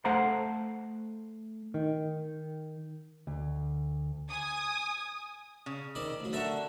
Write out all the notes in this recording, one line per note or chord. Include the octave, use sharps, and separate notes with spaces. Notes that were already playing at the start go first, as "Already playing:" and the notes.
A3 C5 F5 F#5 A#5 C6
D#3
D2
G#5 D#6
C#3
D#3 C4 D5
A1 F#3
D3 F#4 A4 A#4 E5